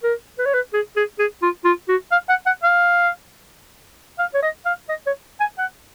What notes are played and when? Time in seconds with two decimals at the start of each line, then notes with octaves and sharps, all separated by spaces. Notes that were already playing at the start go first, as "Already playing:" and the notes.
0.03 A#4
0.39 B4
0.46 C#5
0.54 B4
0.73 G#4
0.96 G#4
1.19 G#4
1.42 F4
1.65 F4
1.88 F#4
2.12 F5
2.29 F#5
2.46 F#5
2.63 F5
4.19 F5
4.34 C#5
4.42 D#5
4.66 F5
4.89 D#5
5.06 C#5
5.40 G#5
5.58 F#5